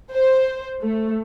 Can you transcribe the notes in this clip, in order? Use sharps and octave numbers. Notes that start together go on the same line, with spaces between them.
C5
A3